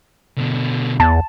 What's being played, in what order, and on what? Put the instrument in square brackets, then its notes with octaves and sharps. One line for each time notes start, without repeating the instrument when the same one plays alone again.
[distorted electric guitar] B2 D3
[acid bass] E2 [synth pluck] A5